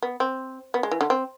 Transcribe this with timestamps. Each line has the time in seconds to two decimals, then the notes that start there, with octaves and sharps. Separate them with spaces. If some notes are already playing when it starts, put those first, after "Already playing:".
0.03 B3
0.20 C4
0.74 B3
0.83 G#3
0.91 E3
1.01 D3
1.10 C4